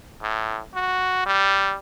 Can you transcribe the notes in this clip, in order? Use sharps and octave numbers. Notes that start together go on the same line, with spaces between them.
A2
F#4
G3